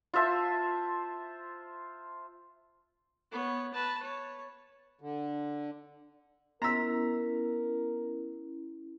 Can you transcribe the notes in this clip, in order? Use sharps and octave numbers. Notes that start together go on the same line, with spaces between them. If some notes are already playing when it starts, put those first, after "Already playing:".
F4 C5 E5 A5
B3 C#5
B4 A5
C#5
D3
B3 C#4 E4 A#4 A#5 E6 B6